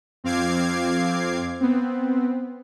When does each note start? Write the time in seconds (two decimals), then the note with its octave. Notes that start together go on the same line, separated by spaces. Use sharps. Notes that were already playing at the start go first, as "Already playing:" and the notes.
0.24 F2 C4 F5 D6 G#6 C7
1.61 B3 C4